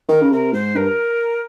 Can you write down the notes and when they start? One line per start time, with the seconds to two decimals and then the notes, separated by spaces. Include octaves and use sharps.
0.09 D#3 A#4
0.22 C#3
0.31 C3 A#4
0.53 G#2 C5
0.75 G2 A#4